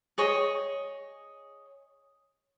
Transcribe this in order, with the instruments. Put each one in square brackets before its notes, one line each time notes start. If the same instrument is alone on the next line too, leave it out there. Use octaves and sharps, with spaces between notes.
[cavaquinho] G#4 C#5 D#5